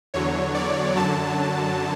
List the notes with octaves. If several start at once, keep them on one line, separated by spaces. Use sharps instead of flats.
E2 D3 F#3 C#5
D5
F#2 D3 F#3 A5